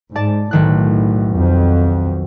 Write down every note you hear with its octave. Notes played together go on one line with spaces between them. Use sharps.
G#2 D5 A5
B1 A2 D#3 F#6
F2